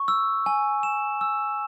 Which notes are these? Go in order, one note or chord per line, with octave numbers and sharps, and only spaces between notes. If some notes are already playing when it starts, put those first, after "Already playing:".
Already playing: C#6
E6
G#5
E7
E6